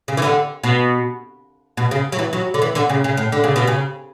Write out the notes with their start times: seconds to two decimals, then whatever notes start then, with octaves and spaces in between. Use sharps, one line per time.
0.08 C#3
0.17 E3
0.22 D3
0.63 B2
1.77 B2
1.91 C#3
2.12 F#3
2.19 E3
2.33 F#3
2.54 D3
2.62 E3
2.75 D3
2.89 C#3
3.04 C#3
3.17 A2
3.32 D3
3.44 C#3
3.56 B2
3.67 C#3